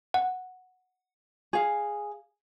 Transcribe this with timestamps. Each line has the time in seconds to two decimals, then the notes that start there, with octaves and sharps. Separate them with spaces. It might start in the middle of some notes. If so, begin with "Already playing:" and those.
0.14 F#5
1.53 G#4 F5